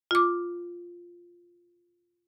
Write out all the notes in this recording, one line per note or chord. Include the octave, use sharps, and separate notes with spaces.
F4 D6